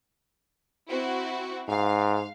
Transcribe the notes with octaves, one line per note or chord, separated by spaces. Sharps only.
C4 E4 F#4
G#2 F5